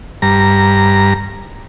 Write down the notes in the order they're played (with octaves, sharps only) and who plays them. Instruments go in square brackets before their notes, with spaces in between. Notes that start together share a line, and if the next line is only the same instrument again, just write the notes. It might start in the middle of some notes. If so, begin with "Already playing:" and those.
[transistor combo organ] G2 A#5